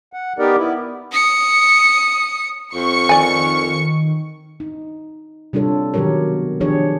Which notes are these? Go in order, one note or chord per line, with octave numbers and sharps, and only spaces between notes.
F#5
B3 D#4 G4 A#4 D5
B3 E4
D#6 C#7
F2 C#6 C#7
D#3 D5 G#5
D#4
C3 G3 D4 F4 A4 C#5
B2 D#3 F#3 G4 A#4 C#5
D#3 F3 D4 G4 G#4 C#5